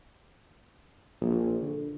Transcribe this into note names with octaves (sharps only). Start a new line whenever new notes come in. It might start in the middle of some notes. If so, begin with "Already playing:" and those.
A#1
D3